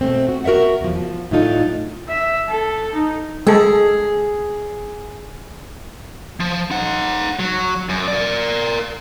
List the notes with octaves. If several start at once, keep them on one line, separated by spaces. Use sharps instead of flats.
B2 A3 C4
F#4
F#4 A#4 D#5 E5 F#5
E2 F3
F3
A2 F#3 D4 D#4 F4 A4
E5
A4
D#4
G#3 G#4 A4
F3
D#4 F#5
F#3
F#2
A#4 D5